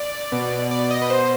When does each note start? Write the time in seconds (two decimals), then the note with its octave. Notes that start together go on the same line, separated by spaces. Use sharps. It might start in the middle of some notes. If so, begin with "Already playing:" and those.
Already playing: D5
0.32 B2 B3
0.71 D5
0.91 D#5
1.02 B4
1.10 C5